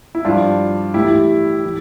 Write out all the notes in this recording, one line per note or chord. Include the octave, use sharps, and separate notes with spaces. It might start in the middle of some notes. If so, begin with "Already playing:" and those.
E4
G2 F3 D4 F4
A2 E3 E4 G4
E3